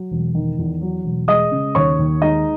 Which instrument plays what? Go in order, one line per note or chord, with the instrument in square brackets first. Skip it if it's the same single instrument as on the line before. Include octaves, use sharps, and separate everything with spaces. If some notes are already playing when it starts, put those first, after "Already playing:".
Already playing: [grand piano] F#3
E1
D#3
E2
F#3
E1
G#3 D#5 D#6
C#3
D#2 C#5 C#6
D#2
G#3 D#4 D#5